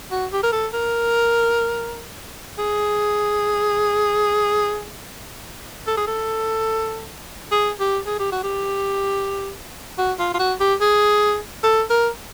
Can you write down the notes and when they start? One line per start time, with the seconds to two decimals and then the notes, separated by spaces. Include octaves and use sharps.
0.11 F#4
0.33 G4
0.43 A#4
0.53 A4
0.73 A#4
2.58 G#4
5.87 A4
5.97 G#4
6.07 A4
7.52 G#4
7.80 G4
8.07 G#4
8.19 G4
8.32 F#4
8.44 G4
9.98 F#4
10.19 F4
10.34 F4
10.39 F#4
10.60 G4
10.81 G#4
11.63 A4
11.90 A#4